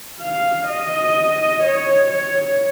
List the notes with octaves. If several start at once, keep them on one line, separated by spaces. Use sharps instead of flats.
F5
D#5
C#5
C#5